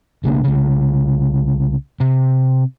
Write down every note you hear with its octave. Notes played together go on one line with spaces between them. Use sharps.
B1 C#3 A#3 D4
C2 C#3
C3